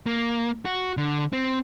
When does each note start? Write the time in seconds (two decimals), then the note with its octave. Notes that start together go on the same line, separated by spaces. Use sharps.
0.06 A#3
0.65 F#4
0.97 D3
1.33 C4